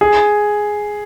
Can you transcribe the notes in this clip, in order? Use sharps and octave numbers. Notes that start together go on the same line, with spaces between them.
G#4